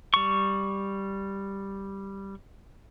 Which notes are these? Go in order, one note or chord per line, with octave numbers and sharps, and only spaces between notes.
G3 C#6